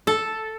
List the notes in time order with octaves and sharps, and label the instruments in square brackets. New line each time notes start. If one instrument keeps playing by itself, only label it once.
[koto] A4